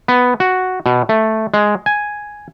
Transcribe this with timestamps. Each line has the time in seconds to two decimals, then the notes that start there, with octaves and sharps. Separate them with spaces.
0.08 B3
0.40 F#4
0.86 B2
1.09 A3
1.54 G#3
1.86 G#5